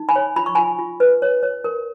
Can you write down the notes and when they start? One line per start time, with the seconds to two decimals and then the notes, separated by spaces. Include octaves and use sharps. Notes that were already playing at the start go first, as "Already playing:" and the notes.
Already playing: D#4
0.09 G#5 B5
0.16 C#5
0.36 F4 B5
0.46 C#6
0.55 F4 G#5 B5
0.79 F4
1.00 B4
1.22 C#5
1.43 C#5
1.64 A#4